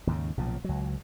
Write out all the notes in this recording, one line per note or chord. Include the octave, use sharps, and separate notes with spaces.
D#2 G#2 C#3
B1 A#2 C#3 F3
C#2 F#3